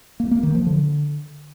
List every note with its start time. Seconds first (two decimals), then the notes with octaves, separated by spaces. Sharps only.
0.20 A#3
0.31 A#3
0.43 D#3
0.55 F3
0.66 D3